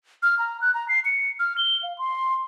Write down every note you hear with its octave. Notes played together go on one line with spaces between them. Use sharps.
F6
A#5
F#6
A#5
C7
C#7
F6
G7
F5
C6